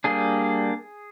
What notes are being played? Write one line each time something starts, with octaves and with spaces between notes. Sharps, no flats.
G3 A#3 D4 G#4